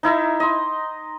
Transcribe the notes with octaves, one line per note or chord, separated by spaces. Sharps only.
D#4 E4 E5 A#5
D#5 C6